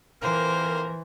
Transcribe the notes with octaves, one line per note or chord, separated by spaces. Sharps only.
F2 E3 A#3 A#4 C5